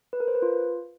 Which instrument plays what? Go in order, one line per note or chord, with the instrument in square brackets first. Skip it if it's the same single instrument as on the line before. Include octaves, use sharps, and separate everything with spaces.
[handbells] B4
A#4
C5
B4
F4